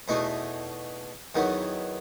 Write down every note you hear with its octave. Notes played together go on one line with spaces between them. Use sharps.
E2 B2 A3 D#4
E2 D#3 F#3 B3